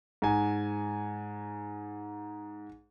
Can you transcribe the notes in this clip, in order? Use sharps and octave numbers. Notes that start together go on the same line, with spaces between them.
G#2 G#5